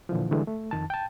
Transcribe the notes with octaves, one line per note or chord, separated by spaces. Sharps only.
A#2 D3 E3 F3
D3 E3 G3 G#3
A3
F2 D#3 A5
G5 A5